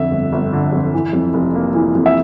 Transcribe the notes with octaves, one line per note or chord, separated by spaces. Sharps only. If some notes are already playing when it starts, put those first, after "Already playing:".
Already playing: F2 D3 E5
G1
G1
D3
F2
E3
F2
F1
A#3
E3
F2
E5